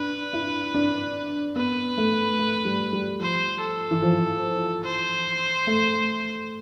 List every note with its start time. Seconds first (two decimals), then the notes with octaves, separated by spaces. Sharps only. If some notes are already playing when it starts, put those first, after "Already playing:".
Already playing: D4 B4
0.33 E4
0.74 D4
1.56 B3 B4
1.97 A3
2.39 A3
2.65 G3
2.93 G3
3.20 F3 C5
3.62 A4
3.91 E3
4.02 F3
4.84 C5
5.67 A3